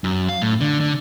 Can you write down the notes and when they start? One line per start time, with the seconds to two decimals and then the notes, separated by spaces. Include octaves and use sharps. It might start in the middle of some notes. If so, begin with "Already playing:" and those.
0.04 F#2
0.29 F5
0.42 A2
0.61 D3
0.80 D3